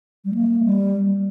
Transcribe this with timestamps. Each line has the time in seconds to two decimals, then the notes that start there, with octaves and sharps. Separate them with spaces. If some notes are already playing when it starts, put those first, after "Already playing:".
0.25 G3
0.34 A#3
0.64 G3